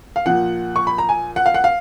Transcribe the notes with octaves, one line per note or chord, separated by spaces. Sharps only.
F5
A#2 F3 F#5
C#6
B5
A#5
G#5
F#5
F5
F#5
F5